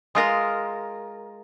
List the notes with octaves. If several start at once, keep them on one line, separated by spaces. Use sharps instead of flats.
G#3 F4 A#4